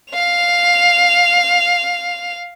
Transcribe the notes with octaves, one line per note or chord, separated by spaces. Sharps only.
F5 F7